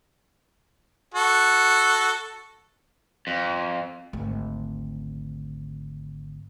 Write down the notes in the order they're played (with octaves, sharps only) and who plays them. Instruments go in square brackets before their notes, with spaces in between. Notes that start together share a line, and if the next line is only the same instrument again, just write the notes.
[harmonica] F#4 A4
[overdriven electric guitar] F2
[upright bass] G#1 D2